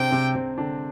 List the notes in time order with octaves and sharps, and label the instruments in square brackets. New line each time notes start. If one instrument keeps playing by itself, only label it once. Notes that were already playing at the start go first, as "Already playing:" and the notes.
Already playing: [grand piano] C3 C4 D4 [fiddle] G5
[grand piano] C3 C4
C3 C4
D3 D4